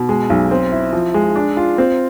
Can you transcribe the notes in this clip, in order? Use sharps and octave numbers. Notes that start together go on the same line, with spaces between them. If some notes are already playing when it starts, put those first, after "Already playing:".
Already playing: B2
G#3
B1
C4
E4
F3
G#3
D4
F4
C4